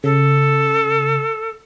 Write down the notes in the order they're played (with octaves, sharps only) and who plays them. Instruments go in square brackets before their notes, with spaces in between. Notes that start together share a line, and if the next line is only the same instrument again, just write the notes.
[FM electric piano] C#3 [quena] A4